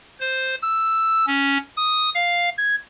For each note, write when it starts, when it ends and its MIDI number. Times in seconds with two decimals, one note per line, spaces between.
0.20 0.55 72
0.62 1.25 88
1.27 1.58 61
1.77 2.10 87
2.15 2.50 77
2.58 2.76 92